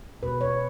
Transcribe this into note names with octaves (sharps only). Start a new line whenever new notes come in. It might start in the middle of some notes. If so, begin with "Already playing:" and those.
B2 G#3 B4
C#5